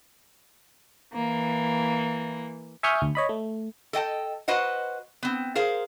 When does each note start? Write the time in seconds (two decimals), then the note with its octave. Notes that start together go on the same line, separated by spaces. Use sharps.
1.13 E3 A#3
2.83 E5 G#5 C#6 D#6 F6 G6
3.02 D2
3.15 C#5 D#5 B5
3.29 A3
3.93 A4 D#5 G5 A5
4.48 F#4 B4 C5 D#5 F#5
5.23 B3 C4
5.55 G#4 A#4 C5 F5